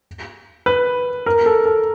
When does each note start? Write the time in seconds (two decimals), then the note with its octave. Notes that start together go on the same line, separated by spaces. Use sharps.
0.66 B4
1.26 A#4
1.46 A4
1.66 A4